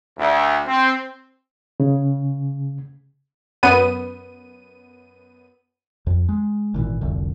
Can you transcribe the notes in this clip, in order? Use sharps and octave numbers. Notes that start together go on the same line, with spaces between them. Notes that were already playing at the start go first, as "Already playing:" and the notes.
D2
C4
C#3
F#2 B3 D#7
F2
G#3
G#1 A#2 D3 E3
F1 C2 D3